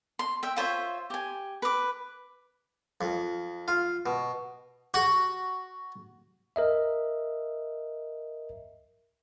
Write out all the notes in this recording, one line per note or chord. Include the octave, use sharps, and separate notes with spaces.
C6
E5 G5
F4 C5 C#5 E5
G4 G#5
B4 D6
F2
F4
B2
F#4
A#4 D#5 E5